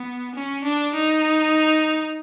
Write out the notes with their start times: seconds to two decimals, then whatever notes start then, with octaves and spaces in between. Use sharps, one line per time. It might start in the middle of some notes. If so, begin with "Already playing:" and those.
Already playing: B3
0.35 C#4
0.64 D4
0.95 D#4